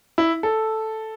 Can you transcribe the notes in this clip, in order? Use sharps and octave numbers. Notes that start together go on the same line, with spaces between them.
E4
A4